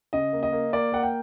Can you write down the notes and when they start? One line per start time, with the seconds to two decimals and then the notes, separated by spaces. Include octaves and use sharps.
0.13 C#3 D#5
0.33 A#3
0.43 D#5
0.52 A#3
0.73 A#3 D5
0.92 A#3 F#5
1.03 G5